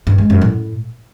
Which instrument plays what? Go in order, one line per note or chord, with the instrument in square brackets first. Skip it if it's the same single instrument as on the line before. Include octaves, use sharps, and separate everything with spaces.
[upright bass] G2
G#3
F#2
A2